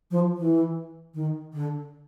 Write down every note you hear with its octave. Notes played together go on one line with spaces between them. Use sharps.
F3
E3
D#3
D3